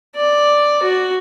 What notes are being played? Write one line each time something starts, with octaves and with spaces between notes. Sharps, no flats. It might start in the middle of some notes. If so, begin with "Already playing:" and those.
D5
F#4